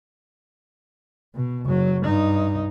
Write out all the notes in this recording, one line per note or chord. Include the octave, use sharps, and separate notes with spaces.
B2
F#1 F#3
G2 D#4